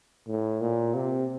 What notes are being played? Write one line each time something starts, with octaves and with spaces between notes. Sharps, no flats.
A2
A#2
C3